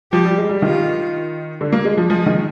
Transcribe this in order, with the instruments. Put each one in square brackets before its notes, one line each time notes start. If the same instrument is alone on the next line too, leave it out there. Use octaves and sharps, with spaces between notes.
[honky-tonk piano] F3 [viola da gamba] G4
[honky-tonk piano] G3
G#3
G3
[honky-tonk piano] D#3 [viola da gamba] F4
[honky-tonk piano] D3
A#3
G#3
F3
[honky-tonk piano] F3 [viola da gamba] G#3
[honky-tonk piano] D#3